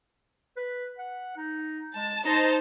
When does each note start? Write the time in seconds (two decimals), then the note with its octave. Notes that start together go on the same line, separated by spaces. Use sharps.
0.57 B4
0.98 F#5
1.37 D#4
1.95 G#3 A5
2.25 D#4 C5 A5 A#5